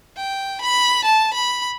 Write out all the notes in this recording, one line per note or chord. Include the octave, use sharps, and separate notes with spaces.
G5
B5
A5
B5